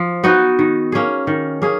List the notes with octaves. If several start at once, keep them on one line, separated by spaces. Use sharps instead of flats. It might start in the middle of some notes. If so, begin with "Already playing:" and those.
Already playing: F3
B3 D#4 F#4
D#3
A#3 C#4 G#4
D#3
A#3 C#4 G#4